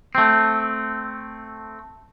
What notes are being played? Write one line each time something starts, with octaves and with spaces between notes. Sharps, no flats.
A3 C4